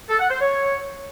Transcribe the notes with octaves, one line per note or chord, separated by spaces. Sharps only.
A4
F#5
C5
C#5